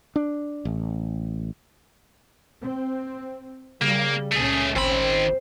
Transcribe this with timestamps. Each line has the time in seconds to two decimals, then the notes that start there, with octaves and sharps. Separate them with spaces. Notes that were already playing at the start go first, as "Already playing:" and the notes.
0.16 D4
0.65 A1
2.63 C4
3.82 C#3 G3 A#3
4.32 C#2 A#2 A3 C#4 G#4
4.76 G#1 D#3 C4 B5